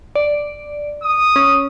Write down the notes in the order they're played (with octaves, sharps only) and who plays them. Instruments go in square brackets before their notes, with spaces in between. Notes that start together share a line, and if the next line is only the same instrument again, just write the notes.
[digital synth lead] D5
[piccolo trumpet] D#6
[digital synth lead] C#4